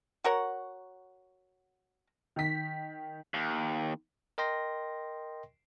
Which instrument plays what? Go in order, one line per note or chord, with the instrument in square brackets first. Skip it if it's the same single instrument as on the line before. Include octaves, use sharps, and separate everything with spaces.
[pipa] F#4 A#4 C#5 F#5
[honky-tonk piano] D#3 B6
[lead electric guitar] D#2
[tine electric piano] A#4 D#5 G5 C6 A#6